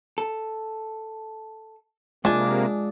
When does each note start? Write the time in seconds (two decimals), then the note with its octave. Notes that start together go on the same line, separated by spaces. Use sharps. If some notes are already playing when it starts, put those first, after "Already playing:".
0.18 A4
2.25 C3 G#3 A#3 D4 F4 G#4 E5 G#5